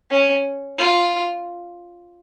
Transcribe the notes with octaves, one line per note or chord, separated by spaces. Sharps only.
C#4
F4